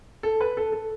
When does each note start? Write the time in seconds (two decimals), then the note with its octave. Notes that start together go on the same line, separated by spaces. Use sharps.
0.23 A4
0.41 B4
0.57 A4
0.72 A4